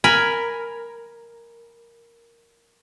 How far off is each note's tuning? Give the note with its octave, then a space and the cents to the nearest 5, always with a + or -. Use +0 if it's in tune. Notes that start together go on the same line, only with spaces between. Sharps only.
A#4 +0 G#5 +0 B5 +0